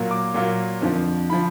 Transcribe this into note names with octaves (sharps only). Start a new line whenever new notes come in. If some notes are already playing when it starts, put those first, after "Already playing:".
Already playing: A#2 F#3 A#3
D6
A#2 F#3 A#3
F2 D3 F3
D3 F3 B5